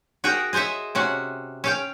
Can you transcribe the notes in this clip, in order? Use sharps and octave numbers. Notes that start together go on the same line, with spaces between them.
F#4 G#4 A#4 G5
G#4 C5 C#5 D#5 E5
C3 C#4 F#4
C#4 F5 G5